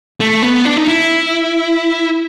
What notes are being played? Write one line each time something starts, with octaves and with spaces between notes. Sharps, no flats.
A3
B3
D4
D#4
E4